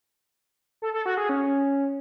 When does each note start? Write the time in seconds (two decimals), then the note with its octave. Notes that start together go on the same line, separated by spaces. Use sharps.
0.82 A4
0.94 A4
1.06 F#4
1.18 G#4
1.29 C#4